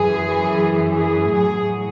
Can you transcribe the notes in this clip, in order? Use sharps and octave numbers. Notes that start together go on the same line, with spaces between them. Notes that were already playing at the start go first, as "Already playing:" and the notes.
Already playing: F#2 E3 G#4
G#4
A2 F#3 G#4